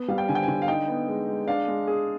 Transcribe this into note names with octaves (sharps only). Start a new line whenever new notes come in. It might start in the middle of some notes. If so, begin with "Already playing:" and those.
Already playing: B3
G3 F5
G5
D3 G#5
G5
G#5
D3
F5
D#4 G5
B3
G#3
G#3
D4 F5
G#3
G#4